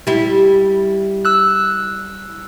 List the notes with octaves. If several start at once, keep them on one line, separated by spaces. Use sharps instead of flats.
G3 E4
E6 F#6